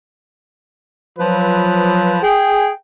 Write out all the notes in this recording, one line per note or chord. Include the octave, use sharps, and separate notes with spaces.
F3 F#3 B4
G#4 G5